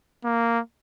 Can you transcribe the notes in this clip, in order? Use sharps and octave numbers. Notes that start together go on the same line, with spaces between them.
A#3